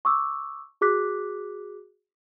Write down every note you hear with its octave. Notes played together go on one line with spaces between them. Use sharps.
C#6 D6 E6
F#4 G#4 D6 F#6 B6